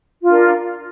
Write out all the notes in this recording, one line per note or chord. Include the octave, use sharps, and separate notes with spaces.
D4 F4 A#4